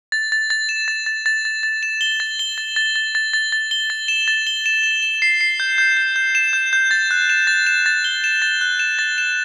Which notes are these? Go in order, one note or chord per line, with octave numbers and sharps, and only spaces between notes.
A6
A6
A6
E7
A6
A6
A6
A6
A6
E7
G7
A6
G7
A6
A6
A6
A6
A6
A6
G7
A6
E7
A6
G7
E7
E7
E7
C7
C7
G6
G6
G6
G6
E7
G6
G6
A6
F#6
E7
A6
E7
A6
G7
E7
A6
F#6
E7
A6
E7